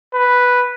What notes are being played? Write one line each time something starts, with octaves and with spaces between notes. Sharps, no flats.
B4